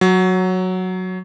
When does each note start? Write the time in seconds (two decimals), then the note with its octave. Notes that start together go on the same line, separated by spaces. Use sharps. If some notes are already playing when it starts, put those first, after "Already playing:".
0.01 F#3